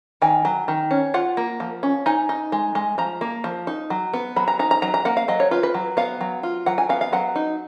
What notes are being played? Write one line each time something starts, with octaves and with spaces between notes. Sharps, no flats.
D#3 G#5
F#3
D#3
C#4
F4 F#5
A#3
F3
C#4
D#4 G#5
D#4
G#3
G#3
F3 A#5
A#3
F3
D#4
F#3
B3
F#3 B5
A#5
D#4 A#5
A#5
F#3 A#5
A#5
A#3 F#5
F5
F#3 D#5
C#5
F4 B4
B4
F#3
B3 F5
F#3
F4
F#3 F#5
G#5
B3 F5
F5
F#3 F#5
D#4